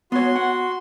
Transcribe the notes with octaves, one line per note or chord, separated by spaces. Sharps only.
B3 F#4 C#5 C6
F#5